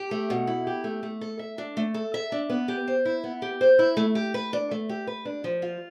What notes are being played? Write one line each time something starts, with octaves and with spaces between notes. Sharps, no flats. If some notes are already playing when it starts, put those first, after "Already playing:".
Already playing: G4
A3
B2
E4
G4
A3
A3
A4
E5
D4
A3
A4
E5
D4
B3
G4
C5
E4
B3
G4
C5
E4
A3
G4
B4
D4
A3
G4
B4
D4
F3
F4